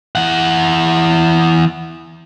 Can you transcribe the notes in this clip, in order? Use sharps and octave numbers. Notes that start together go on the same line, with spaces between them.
E3 F#5